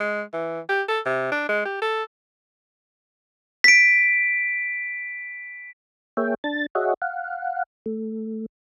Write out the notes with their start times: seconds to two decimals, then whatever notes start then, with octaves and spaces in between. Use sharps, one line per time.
0.01 G#3
0.33 E3
0.69 G4
0.88 A4
1.06 C3
1.32 D4
1.49 G#3
1.65 G4
1.82 A4
3.64 B6 D7
6.17 A#3 G#4 C#5 E5 G5
6.44 D4 A5 A6
6.75 F#4 G#4 C#5 D#5 E5 F#5
7.02 F5 F#5
7.86 A3